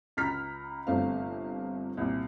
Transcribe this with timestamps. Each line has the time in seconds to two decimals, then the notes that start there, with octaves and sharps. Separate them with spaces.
0.17 C#2 A#5 F6 B6
0.87 G1 C3 A3 C5 F5
1.97 C2 A#2